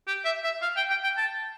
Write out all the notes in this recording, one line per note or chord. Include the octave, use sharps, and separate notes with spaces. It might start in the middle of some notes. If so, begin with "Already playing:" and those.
G4
E5
E5
F5
G5
G5
G5
A5